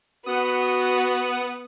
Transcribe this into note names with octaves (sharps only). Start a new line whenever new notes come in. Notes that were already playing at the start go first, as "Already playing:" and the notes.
B3 F#4 F#5 D#6